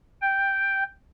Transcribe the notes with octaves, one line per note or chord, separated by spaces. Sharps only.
G5